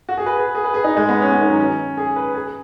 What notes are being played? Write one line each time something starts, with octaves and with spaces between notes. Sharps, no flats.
F#4
G#4
B4
G#4
G#4
B4
G#4
D#4
G#3
B3
C#4
B3
D#3
F#3
C#4
G#4
B4
G#4